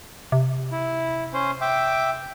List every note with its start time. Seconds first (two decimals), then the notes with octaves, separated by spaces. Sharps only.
0.32 C3
0.72 E4
1.33 C#4 C5
1.61 E5 G5 D6